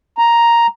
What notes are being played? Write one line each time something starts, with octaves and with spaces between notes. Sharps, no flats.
A#5